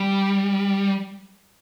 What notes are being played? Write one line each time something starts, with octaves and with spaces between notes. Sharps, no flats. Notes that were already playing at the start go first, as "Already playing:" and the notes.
Already playing: G3